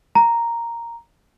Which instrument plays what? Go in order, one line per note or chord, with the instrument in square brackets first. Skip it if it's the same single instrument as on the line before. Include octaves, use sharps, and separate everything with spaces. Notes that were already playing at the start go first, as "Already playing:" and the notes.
[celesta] A#5